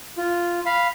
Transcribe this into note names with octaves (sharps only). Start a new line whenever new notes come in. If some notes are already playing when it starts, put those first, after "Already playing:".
F4
F5 B5